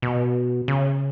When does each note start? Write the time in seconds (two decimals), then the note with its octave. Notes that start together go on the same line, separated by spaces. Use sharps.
0.02 B2
0.68 C#3